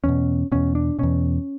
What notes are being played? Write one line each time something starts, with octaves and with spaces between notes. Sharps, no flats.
E2 B2 C#4
E2 B2 C#4
D4
E2 B2 C#4